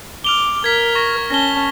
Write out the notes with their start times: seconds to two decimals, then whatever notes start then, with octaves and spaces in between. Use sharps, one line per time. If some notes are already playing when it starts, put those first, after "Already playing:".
0.24 D6 F6 F7 G7
0.64 A#4 G#6 B6
0.95 C#6 A#6
1.31 C#4 A5 A#6 G7